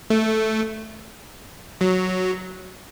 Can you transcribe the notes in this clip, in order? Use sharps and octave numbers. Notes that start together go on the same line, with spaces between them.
A3
F#3